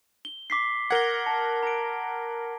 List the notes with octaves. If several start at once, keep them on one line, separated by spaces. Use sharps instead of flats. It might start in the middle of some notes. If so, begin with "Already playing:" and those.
G7
D6 B6 C7
A#4 F#5 G#6 A#6 G7
A5
A#5 D7